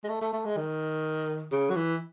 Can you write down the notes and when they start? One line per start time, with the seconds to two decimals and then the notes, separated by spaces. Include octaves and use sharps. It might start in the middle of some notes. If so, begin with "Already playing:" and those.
0.04 G#3
0.09 A3
0.22 A3
0.33 A3
0.45 G#3
0.57 D#3
1.52 C#3
1.70 F#3
1.76 E3